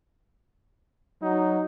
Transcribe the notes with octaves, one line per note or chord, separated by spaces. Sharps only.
F#3 D#4